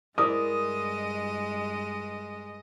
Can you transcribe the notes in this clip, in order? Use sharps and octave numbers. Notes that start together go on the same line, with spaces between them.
G2 G#3 E4 A#4 D5 D#5 D#6